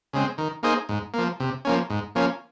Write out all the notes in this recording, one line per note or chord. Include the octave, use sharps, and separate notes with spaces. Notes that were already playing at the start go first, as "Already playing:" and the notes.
C#3 G#3 C4
D#3
A#3 D#4 G#4 C5
G#2
F3 A#3
C3
F3 A#3 C#4
G#2
F3 A#3 C#4